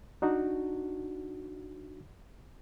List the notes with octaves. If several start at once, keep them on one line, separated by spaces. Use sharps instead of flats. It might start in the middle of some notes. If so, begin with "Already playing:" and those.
D4 D#4 F#4